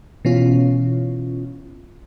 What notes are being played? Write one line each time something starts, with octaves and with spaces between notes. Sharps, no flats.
B2 E3 C#4 F4